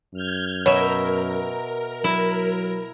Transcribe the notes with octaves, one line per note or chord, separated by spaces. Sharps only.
F#2 F6 G6 G#6
B2 A#4 C#5 E5
F#3 E4